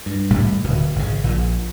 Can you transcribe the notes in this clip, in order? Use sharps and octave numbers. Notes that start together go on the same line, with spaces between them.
G2
G#1 A2 C3 G3
D1 B2
G#1 C#3
A#1 A#2